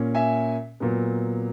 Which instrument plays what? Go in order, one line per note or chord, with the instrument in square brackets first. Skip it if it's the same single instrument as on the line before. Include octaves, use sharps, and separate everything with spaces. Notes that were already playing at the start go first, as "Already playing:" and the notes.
Already playing: [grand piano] A#2 A#3 C#4
E5 G#5
A#2 F#3 B3